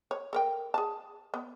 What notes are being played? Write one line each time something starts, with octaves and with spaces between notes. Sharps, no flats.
C#5
A4 A#4 G5
G#4 A5
B3